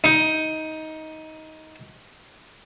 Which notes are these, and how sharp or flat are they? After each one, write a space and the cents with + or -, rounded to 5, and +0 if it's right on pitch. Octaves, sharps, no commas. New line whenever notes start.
D#4 +15